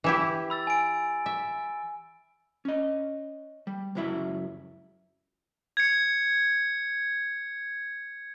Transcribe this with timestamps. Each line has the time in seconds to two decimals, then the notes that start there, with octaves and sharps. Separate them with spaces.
0.04 E3 E4 G4
0.50 B5 E6 A6
0.67 G#5 D7
1.26 E5
2.65 C#4 D#5
3.67 G3
3.95 C#2 F#2 F#3 E4 E5
5.77 G#6 C#7